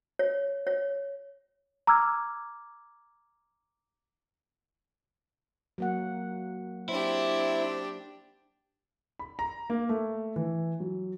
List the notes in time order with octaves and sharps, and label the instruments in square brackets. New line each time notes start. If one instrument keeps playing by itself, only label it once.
[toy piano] C#5
C#5
[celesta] A#5 D6 E6 F6 G#6
[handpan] F#3 A#3 F#5
[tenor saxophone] C4 [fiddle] D4 G4 [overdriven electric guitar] E4
[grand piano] B5
A#5
A#3
A3
E3
F#3